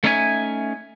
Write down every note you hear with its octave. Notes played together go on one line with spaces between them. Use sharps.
A3 C#4 D#4 E4 E5 G#5